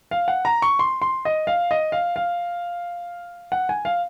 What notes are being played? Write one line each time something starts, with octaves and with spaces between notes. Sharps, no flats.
F5
F#5
A#5
C#6
C6
C6
D#5
F5
D#5
F5
F5
F#5
G#5
F5